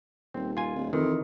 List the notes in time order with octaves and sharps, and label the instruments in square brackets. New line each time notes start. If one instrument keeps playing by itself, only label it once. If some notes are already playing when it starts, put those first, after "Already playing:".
[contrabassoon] D#1 [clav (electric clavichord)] C4
[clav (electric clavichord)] F4 G#5
[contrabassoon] D1
[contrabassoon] F2 [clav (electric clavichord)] D#3 E3